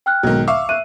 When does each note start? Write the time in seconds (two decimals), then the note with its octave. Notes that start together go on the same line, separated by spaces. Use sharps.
0.06 G5 F6 F#6
0.23 B1 G#2 D#3 F#3
0.47 E5 F5 C#6 D6 E6
0.69 E5 F#6 D#7